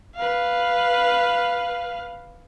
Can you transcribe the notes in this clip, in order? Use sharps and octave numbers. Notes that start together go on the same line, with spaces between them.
B4 F5